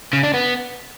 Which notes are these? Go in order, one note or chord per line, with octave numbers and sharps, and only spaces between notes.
C#3
D4
B3